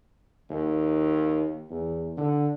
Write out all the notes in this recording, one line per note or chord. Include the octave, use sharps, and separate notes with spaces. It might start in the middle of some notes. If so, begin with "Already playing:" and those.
D#2
E2
D3